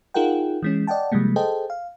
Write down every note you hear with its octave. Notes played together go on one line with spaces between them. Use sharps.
D#4 F4 G#4 A#4 F#5 G5
E3 G#3 C#4
D5 D#5 F#5 G5 A5
C3 F3 G3 G#3 A#3
G#4 A4 C5 D#5 G5 A5
F5